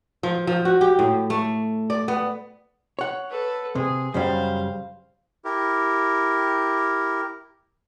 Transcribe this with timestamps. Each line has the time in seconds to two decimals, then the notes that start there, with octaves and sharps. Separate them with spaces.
0.23 F3
0.47 F3
0.65 F#4
0.81 G4
0.99 A2
1.30 A3
1.90 D5
2.08 B3
2.99 C#5 F#5
3.30 A4 B4
3.75 C3 G#4
4.14 F#2 C#3 G3 C5 F5
5.45 E4 G4 A#4